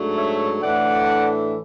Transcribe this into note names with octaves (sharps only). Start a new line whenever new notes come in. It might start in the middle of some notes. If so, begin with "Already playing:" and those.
Already playing: G#2 F#3 A3 D4
C#5 E5
A2 E3 A3 D4 D5 F#5